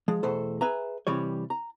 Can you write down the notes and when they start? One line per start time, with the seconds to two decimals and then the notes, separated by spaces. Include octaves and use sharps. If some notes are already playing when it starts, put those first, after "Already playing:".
0.08 F3 G#3
0.23 E2 B2 A3 A4 C5
0.61 G#4 B4 E5 G#5 A#5
1.07 C3 E3 G3 C#5
1.50 A#5